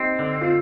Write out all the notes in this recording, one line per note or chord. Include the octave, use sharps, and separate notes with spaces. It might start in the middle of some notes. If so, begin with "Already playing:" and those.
Already playing: C4 D#4 G4
D3
F4